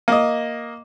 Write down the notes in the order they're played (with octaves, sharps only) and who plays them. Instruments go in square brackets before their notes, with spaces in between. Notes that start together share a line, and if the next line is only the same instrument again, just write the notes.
[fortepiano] A#3 D#5